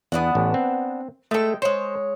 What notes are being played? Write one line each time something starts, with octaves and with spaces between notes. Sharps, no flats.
E2 B3 D4 F#5
A1
C4
G#3 A3 A4 G5
G#3 C5 C#5